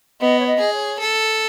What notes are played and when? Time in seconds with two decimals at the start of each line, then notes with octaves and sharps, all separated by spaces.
0.20 B3 D#5
0.38 C#5
0.46 D#5
0.60 G#4
0.72 C#5
0.99 A4